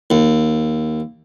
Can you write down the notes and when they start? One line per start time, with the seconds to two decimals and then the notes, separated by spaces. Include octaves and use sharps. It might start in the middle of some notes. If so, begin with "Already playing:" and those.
0.10 D#2